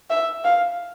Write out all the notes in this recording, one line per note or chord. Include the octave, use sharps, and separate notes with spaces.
E5
F5